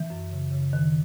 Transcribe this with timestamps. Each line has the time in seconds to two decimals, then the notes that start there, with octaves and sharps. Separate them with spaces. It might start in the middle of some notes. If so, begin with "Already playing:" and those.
Already playing: E3
0.10 F#2
0.31 C#3
0.51 C#3
0.73 D#3